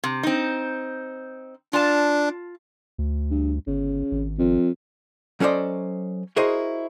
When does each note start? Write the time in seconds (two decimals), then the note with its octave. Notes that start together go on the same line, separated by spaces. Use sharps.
0.04 C3
0.23 C4 D#4
1.73 D4 F4 A5
2.98 D2
3.31 G2
3.67 G1 C#3
4.12 G#1
4.39 F2
5.40 F#3 C#4 A4 C5 D5 D#5
6.36 E4 F#4 G#4 A#4 C5 D#5